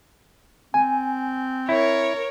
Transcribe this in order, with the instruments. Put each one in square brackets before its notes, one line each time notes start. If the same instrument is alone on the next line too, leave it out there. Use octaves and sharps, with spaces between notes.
[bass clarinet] C4 [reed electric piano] G#5
[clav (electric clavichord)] E4 [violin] A#4 C#5